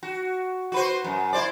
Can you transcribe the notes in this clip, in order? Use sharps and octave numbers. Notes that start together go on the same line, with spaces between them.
F#4
F#4 B4 C5
F#2
E4 C5 D5